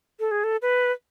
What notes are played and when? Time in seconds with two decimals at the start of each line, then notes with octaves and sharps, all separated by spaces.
0.20 A4
0.31 G#4
0.44 A4
0.62 B4